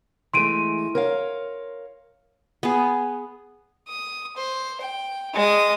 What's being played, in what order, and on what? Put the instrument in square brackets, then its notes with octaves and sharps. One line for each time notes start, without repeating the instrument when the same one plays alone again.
[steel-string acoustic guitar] E3 G#3 A3 [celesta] C6 D7 D#7
[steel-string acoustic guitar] A#4 C#5 F5
[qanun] B3 G#4
[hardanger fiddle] D#6
C5
G5
G#3 D#6